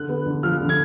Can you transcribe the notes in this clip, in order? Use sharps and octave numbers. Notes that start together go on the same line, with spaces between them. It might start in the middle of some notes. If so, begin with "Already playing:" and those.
Already playing: D3 F#6
B3
D3
F3 F6
D3
G#6